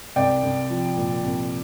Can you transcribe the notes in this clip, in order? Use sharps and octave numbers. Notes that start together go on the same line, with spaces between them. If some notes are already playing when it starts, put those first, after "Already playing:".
C2 D5 G5
C2
F3
A#2
C2